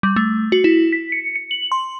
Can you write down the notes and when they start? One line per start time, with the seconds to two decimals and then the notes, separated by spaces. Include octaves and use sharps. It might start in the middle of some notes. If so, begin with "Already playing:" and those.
0.03 G3
0.16 A3
0.52 F#4
0.64 E4
0.92 B6
1.12 C#7
1.36 C#7
1.51 F#7
1.72 C6